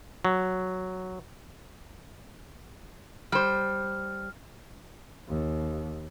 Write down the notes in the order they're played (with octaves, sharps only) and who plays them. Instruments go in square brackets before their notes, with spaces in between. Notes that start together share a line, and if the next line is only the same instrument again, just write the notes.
[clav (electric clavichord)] F#3
[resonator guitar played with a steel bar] G3 C5 [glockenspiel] F6
[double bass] D#2